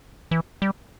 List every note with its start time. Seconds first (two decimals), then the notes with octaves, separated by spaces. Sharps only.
0.31 E3
0.62 G3